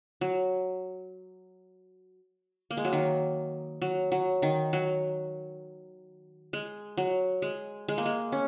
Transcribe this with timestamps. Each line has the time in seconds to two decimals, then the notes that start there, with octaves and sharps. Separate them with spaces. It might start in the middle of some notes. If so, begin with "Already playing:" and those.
0.21 F#3
2.71 A#3
2.77 G#3
2.85 F#3
2.93 D#3
3.82 F#3
4.12 F#3
4.42 D#3
4.73 F#3
6.53 G#3
6.97 F#3
7.42 G#3
7.88 G#3
7.98 A#3
8.06 G#3
8.32 C#4